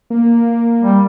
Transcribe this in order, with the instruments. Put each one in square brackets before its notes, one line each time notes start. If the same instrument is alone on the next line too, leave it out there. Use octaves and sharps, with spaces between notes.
[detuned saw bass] A#3
[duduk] G3